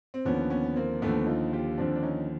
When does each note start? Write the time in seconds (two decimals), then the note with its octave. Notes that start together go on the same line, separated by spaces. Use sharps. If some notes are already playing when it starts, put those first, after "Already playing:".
0.14 C4
0.25 D#2 D3 F3 B3 C#4
0.50 B3 C#4
0.76 A#3 C4
1.02 D#2 D3 F3 A3 B3
1.26 D#4 F4
1.53 F4 G4
1.78 D#2 D3 F3 C4 D4
1.95 D4
2.03 C#4 D#4